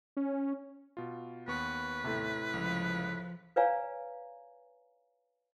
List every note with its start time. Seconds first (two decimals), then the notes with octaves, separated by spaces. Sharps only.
0.17 C#4
0.97 B2 F4
1.48 D#2 B3 B4 C#6
2.04 A2 C3
2.54 C#2 F3
3.56 B4 C#5 D5 F5 G#5 A#5